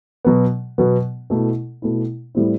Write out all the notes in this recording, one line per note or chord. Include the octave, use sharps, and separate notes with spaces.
B2 F#3 B3
B2 F#3 B3
B2 A3 E4
B2 A3 E4
A2 G3 C4 E4